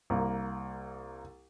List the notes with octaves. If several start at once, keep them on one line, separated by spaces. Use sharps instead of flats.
C2 A#3